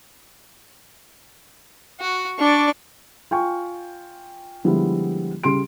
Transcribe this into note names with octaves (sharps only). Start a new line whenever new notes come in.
F#4
D4 D5 C#6
F4 G5 G#5 C#6
D3 F3 G3 G#3 B3 E4
C#3 G3 C6 D7